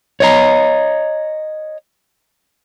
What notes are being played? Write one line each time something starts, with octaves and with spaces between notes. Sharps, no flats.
C#5 D#5 A#5